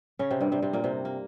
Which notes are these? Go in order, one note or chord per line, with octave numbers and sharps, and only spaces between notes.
C#3 C#4
C3 C4
G2 G3
C3 C4
C3 C4
A#2 A#3
C3 C4
A#3